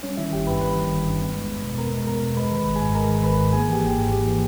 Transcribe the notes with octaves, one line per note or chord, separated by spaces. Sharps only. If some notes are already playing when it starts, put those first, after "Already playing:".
G3 C#4 C#5
D#3 E4 E5
G1 G4 G5
G2 B4 B5
G3 B4 B5
D#3
G1
G2
B3
G#3
E2
B2
B3 A#4 A#5
G#3
E2 A#4 A#5
B2
G#3 B4 B5
D#3 B4 B5
G#1
G#2 G#4 G#5
G#3 A#4 A#5
D#3
G#1 B4 B5
G#2
A#3 G#4 G#5
E3 G4 G5
G#1
G#2
A#3 G4
E3